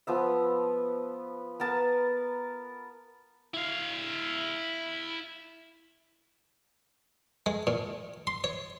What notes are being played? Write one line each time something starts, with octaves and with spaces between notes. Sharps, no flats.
F3 B3 E5
B3 A#4 A5
E4 F5
G#3
A#2
C6
C#5